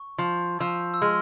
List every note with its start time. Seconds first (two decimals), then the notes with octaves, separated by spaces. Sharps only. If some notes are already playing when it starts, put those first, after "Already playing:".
Already playing: C#6
0.18 F3
0.60 F3 E6
0.94 E6
1.02 G#3 F6